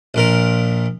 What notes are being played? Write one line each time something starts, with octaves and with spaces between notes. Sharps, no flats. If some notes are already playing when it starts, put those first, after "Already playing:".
A#1 A#2 A#4